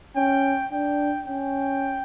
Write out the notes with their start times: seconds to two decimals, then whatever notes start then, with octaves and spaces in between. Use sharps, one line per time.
0.16 C#4 G5
0.72 D4 G5
1.27 C#4 G5